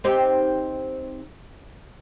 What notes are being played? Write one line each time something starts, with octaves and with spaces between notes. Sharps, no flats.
C4 D#4 G4